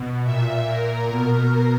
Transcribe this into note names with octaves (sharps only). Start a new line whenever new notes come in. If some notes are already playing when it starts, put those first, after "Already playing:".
Already playing: B2
A#2 E5
A#2 A#4
B2